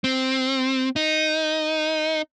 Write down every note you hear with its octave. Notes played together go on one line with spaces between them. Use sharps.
C4
D#4